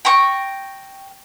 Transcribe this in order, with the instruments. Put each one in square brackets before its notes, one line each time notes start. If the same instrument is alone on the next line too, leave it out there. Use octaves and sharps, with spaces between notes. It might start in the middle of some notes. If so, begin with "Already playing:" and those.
[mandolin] G5 A#5 C#6